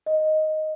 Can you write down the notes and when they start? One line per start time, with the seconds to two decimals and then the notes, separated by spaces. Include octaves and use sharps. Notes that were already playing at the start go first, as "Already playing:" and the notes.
0.06 D#5